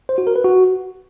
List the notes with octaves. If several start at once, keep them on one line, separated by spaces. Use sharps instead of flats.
C5
F#4
A#4
B4
F#4